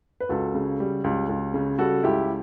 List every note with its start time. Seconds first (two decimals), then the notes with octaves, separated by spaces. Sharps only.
0.20 B4
0.29 C#2 F#4 A4
0.55 C#3
0.80 G3
1.04 C#2
1.29 C#2
1.54 C#3
1.79 G3 F#4 A4
2.03 C#2 E4 G4